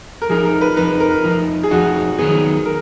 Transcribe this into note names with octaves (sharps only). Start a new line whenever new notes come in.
A#4
F2 F3 D#4 G#4
A#4
B4
F2 F3 D#4 B4
A#4
F2 F3 D#4
G#4
F2 F3 D#4 F#4
D#3 F#3 B3 G#4
A#4